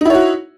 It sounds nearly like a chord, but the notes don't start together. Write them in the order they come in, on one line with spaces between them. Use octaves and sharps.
D#4 E4 C#5 F#4